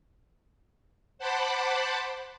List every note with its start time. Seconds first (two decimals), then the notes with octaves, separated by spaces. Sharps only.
1.19 C5 F#5 A5 B5 D6